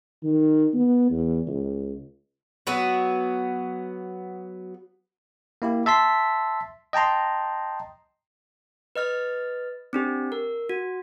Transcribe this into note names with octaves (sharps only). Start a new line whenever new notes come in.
D#3
B3
E2
C#2
F#3 B3 F#4
A#3 E4 G4
E5 A5 C6 B6
D#5 G5 A5 A#5 C6
B4 D#5 F6 A6
C4 D4 G4
A#4
F#4